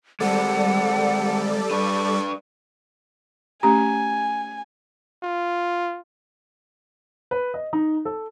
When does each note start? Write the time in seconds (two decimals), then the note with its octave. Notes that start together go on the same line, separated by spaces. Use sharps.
0.20 G3 G#3 C4 A4 D5 F#5
1.71 D4 B4 C#6
3.63 A3 C#4 G4 G#5 A#5
5.23 F4
7.31 B4
7.54 D#5
7.73 D#4
8.05 A4